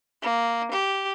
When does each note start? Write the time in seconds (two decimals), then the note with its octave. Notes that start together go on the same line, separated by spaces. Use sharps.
0.22 A#3
0.71 G4